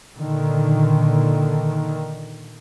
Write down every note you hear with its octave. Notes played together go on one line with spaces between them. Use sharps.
A#2 D3 D#3